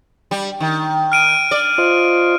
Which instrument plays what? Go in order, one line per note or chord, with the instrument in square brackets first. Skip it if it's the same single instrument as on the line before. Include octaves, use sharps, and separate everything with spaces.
[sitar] G3
D#3
[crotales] F6 D7 D#7
[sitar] D5
[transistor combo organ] F4 C5 D#5